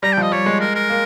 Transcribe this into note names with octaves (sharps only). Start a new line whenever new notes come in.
G3 A#5
G5
F3
D#5
G3 C#5
G#3
A#4
A#4
A#3